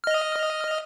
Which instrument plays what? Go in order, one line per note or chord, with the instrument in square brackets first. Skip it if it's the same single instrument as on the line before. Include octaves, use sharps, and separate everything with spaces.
[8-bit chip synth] D#5 F6